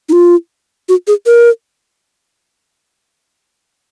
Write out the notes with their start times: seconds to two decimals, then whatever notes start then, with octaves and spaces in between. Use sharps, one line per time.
0.09 D#4
0.13 F4
0.89 F#4
1.07 G#4
1.26 A#4